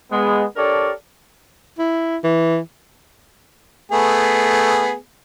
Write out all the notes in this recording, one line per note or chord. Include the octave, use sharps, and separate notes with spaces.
G#3 B3
D4 G4 A4 A#4 C#5 D5
E4
E3
A3 B3 G#4